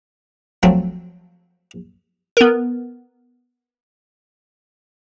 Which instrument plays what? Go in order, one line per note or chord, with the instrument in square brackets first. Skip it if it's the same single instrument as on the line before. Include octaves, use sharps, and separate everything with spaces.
[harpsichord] F3 F#3 A3 C4
[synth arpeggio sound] B3 A#4